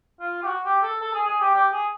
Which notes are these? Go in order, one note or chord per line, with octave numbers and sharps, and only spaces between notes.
F4
G4
F#4
G4
A4
A4
G#4
G#4
G4
G4
G#4